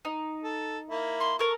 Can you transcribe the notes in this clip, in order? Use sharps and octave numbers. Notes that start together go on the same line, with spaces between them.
D#4
A4
A#3 E4
C6
A4 A#4 C#6